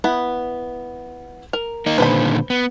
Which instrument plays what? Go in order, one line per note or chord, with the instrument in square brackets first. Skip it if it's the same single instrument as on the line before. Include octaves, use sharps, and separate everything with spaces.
[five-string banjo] B3 E4 B5
A#4
[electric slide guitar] A#3 D#4
[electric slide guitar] A#2 D3 D#3 [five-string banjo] B4 C5 B5
[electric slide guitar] B3